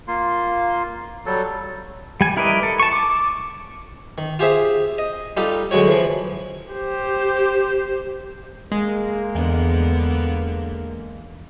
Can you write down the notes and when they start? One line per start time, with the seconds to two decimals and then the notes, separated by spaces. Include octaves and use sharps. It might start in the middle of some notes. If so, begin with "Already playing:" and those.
0.08 A#3 F4 C6
1.26 F#3 G3 A4
2.21 G3 G#5
2.37 E4 A#4 B4 D5 D#5
2.63 A4
2.80 A5 C#6
2.93 D6
4.18 D#3
4.39 F4 G4 G#4 C5 E5
4.98 D#5
5.37 G3 D#4 F4 G4 A4
5.71 D3 F#3 G#3 F#4 C#5
5.87 E3 F3
6.72 G4 C5
8.72 G#3 A#3
9.35 E2 D3 B3